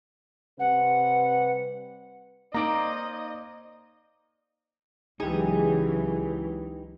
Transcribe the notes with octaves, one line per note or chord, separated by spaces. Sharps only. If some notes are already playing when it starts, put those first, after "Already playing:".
C3 G3 B4 F#5
A#3 C4 D#4 D5 D#5 A#5
C#2 E3 F#3 D#4 G4 G#4